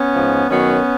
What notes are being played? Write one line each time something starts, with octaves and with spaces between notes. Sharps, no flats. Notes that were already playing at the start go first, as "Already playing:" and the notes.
Already playing: B3 C#4
G#2 F3
F#2 D#3 F#3 B3 C#4